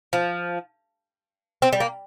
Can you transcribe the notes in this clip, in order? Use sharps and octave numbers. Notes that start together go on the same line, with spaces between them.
F3
C4
G3
A#3